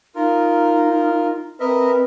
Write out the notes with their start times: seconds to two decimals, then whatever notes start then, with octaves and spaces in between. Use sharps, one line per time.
0.15 D#4 F4 A#4
1.60 C4 A#4 B4 D#5 E5